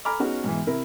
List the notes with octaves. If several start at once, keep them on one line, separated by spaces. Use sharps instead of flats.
A4 G#5 A#5 B5 D6 F6
B3 C#4 D#4 F#4 G#4
G#2 B2 E3
C3 E4 A#4